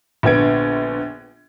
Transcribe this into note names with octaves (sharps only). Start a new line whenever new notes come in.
A#1 D3 B3 G#6 D7